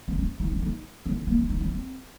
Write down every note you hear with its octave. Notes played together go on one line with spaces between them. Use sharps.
C4
C#4
D#4
C#4
D#4
C#4
C4
A#3
C#4
D#4
C#4
C4